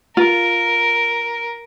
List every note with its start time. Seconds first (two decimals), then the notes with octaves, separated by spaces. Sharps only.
0.17 F4 A#4